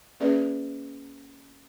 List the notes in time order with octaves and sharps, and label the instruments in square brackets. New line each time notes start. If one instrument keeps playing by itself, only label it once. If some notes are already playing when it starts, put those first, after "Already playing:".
[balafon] A#3 C#4 G#4 B4 D5 E5